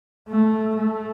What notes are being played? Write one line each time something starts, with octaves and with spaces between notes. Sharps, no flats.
A3
A3